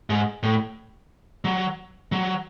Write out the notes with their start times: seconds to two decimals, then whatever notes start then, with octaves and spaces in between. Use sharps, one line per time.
0.10 G#2
0.43 A2
1.45 F#3
2.12 F#3